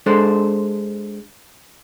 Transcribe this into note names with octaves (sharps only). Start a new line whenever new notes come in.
G#3 D4 A4 C5